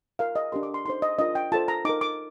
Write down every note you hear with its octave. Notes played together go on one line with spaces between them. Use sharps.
F4 A#4 F5
D#5
D4 G4 A#4 C6
D6
C6
D#4 A4 C5 C6
D#5
D4 F4 A#4 D#5
G5
F4 A4 C5 A5
A#5
D#4 A#4 D6
D6